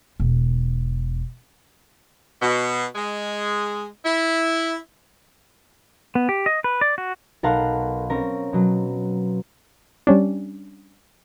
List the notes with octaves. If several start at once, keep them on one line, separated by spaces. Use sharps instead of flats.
E1
B2
G#3
E4
B3
G4
D#5
B4
D5
F#4
B1 A4 A#4 F5 F#5 C6
C4 C#4 A#4
B2 F#3
G3 C#4 D4